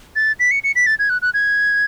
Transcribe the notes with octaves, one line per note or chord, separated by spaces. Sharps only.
A6
B6
C#7
C#7
B6
A6
G#6
F#6
F#6
G#6